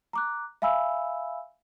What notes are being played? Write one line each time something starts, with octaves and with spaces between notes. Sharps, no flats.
A#5 D6 F#6
E5 F5 G#5 B5 E6